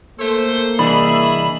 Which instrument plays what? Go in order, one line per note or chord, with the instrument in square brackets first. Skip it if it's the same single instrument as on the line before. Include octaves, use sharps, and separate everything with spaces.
[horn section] A3 A4 C5 [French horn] A#3
[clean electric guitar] C2 E3 D4 [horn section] G#4 D#5 E5 [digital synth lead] B5